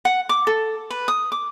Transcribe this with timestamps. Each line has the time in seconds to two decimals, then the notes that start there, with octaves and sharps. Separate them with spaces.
0.05 F#5
0.29 D6
0.47 A4
0.90 B4
1.08 D#6
1.32 D6